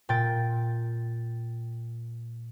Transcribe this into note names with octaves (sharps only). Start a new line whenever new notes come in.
A#2 G5 A6